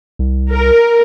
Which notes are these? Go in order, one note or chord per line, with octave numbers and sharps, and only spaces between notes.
C2
A#4